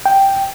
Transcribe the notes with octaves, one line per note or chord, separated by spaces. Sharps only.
G5